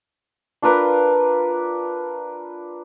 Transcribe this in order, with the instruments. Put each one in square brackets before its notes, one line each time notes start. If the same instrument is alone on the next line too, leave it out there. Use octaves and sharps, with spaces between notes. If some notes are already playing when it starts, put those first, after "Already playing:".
[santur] D4 F4 A#4 B4